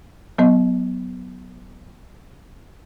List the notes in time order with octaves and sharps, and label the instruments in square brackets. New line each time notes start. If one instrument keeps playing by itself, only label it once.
[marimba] F#3 B3 D#5